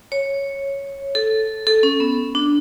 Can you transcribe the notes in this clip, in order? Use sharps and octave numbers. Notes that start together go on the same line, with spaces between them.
C#5
A4
A4
C#4
B3
D4